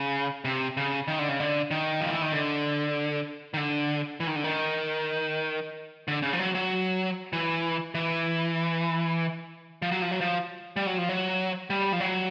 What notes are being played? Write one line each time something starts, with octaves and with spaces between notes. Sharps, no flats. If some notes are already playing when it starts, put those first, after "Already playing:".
Already playing: C#3
C3
C#3
D#3
D3
C#3
D3
D#3
F3
E3
D#3
D3
D#3
D3
E3
D#3
D3
D#3
D3
C#3
F3
F#3
F#3
E3
E3
F3
F#3
F3
F#3
F3
G3
F#3
F3
F#3
G3
F3
F#3